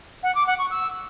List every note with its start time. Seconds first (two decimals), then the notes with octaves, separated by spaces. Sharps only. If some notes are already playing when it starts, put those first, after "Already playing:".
0.23 F#5
0.35 D6
0.47 F#5
0.58 C#6
0.70 E6